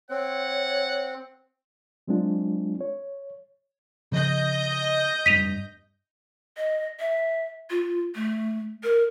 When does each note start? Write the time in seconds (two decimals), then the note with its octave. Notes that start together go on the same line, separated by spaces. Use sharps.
0.10 C4 C#5 F#5
2.08 F#3 G#3 C4 D4 F4
2.81 C#5
4.12 C#3 F3 D#5 G6 A#6
5.26 F1 G2 B6 D#7 F7
6.57 D#5
7.00 E5
7.70 F4
8.15 A3
8.84 A#4